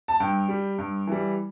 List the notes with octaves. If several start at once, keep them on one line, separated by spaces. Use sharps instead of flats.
A5
G2 G5
G3
G2
E3 G3